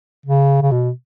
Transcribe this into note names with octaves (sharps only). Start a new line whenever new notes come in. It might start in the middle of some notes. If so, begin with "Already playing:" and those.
C#3
C#3
B2